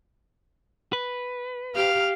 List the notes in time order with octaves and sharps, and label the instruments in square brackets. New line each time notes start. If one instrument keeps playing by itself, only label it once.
[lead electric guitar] B4
[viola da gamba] G4 [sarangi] F5 [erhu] F6